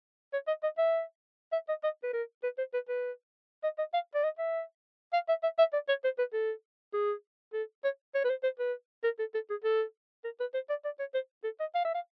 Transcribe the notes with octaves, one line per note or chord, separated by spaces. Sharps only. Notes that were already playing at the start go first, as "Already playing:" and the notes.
C#5
D#5
D#5
E5
E5
D#5
D#5
B4
A#4
B4
C5
B4
B4
D#5
D#5
F5
D5
D#5
E5
F5
E5
E5
E5
D5
C#5
C5
B4
A4
G#4
A4
C#5
C#5
B4
C5
C5
B4
A#4
A4
A4
G#4
A4
A#4
B4
C5
D5
D5
C#5
C5
A4
D#5
F5
E5
F5